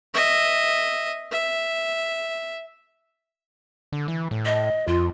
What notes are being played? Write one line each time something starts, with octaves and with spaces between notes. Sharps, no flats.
D#5 E5
E5
D3
E3
A2
D#5
F2 F4